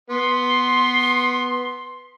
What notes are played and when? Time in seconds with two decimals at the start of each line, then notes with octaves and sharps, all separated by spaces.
0.10 B3 C6